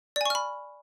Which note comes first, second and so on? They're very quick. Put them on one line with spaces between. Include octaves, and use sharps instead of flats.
D5 G#5 C#6 F6 B5